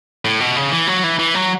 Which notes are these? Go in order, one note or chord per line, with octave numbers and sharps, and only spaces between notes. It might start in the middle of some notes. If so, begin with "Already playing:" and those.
A2
B2
C#3
E3
F#3
E3
E3
F#3